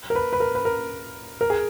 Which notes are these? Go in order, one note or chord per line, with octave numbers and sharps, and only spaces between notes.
A#4
B4
B4
A#4
B4
A#4
A#4
G#4